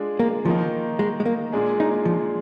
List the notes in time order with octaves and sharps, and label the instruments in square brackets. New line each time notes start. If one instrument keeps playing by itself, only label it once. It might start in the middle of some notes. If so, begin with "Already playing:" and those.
Already playing: [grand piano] G#3 D4 F4 G#4
[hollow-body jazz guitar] A#3
[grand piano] D#3 A#3 D#4 [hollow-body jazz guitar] F3
[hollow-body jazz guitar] G#3
G#3
A#3
[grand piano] A#2 G#3 D4 G#4
[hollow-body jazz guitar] D#4
F3